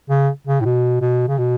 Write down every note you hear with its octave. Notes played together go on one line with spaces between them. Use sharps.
C#3
C#3
A2
B2
B2
C#3
B2